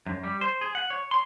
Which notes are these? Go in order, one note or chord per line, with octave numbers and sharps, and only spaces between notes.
F#2
G3
C5
G#4
F#5
C#5
C6